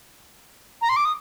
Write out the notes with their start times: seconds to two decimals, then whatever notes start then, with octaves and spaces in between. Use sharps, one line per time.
0.82 A#5
0.89 C6
0.96 D6
1.05 D#6